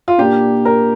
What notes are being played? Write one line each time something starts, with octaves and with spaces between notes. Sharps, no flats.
F4
A#2 A#3 D4 G4
A#4